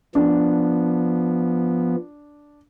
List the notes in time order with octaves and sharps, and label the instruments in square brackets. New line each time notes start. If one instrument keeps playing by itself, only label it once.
[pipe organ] F3 B3 [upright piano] D4